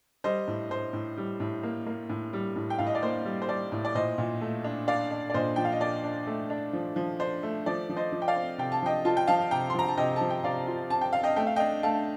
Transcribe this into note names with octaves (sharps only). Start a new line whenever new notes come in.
G3 C5 D#5
A2
A2 C5
A2
G3
A2
A#3
A#3
A2
G3
A2
G5
A2 F5
D#5
D5
A#3 C5
G3
C5
G3 D5
A2
D5
A#2 C5 D#5
A#2
A3
D4
D4 D5 F5
D4
D5
A#2 C5 D#5
F3 G5
F5
D#5
D4 D5
D4
A3
D4
F3
F3
D4 C5
A3
F3 D5
F3
C5 D#5
F3
G5
D5 F5
C4
C3 G5
A5
F3 D#5 G5
F4 A5
G5
F3 F5 A5
C3 G5 A#5
C6
F3 A#5
A5
C3 D#5 G5
F3 A5
G5
C3 D5 F5
F4
C4 A5
G5
C4 F5
D#5 G5
A3 G5
F5
D4 D#5 G5
A3 F5 A5